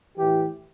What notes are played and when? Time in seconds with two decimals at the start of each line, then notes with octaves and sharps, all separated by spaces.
0.17 A2 E3 G4